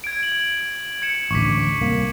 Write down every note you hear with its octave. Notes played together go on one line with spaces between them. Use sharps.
G#6 D7
F#7
G#6 C#7 E7
A1 D2 C#6 D6 B6
C2 A#3